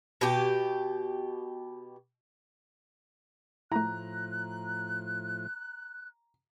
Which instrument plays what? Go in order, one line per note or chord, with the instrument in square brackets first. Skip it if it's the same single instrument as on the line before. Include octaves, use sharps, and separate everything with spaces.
[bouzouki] B2 G4
[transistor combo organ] A2 F3 [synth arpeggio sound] A3 E4 [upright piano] A#5 [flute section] F#6